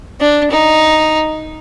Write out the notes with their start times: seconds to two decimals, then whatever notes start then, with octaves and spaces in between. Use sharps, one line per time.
0.20 D4
0.51 D#4